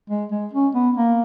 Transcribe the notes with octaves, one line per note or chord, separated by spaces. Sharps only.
G#3
G#3
C#4
B3
A#3